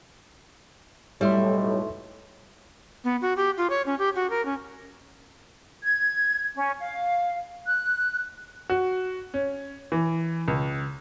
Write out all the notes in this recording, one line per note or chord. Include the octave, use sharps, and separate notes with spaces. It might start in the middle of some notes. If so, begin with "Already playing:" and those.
B1 A2 G3 E4 C#5 E5 C6
B3
F#4
G4
F4
C#5
C#4
G4
F#4
A#4
C#4
G#6
C#4
F5
F#6
F#4
C#4
E3
C#2